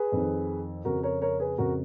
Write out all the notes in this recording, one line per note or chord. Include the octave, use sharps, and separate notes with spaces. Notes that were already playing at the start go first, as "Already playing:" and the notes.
Already playing: G#4 B4
F2 D#3
F2 C#3 F#4 A#4
A#4 C#5
A#4 C#5
G#4 B4
F2 C#3 F#4 A#4